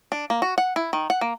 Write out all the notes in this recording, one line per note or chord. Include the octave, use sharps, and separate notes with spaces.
D4
A#3
F#4
F#5
E4
D#3
F#5
A#3